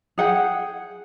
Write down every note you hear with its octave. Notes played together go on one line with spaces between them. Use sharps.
G#4 F#5 G5